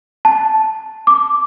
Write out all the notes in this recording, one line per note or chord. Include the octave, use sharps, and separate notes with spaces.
A5
D6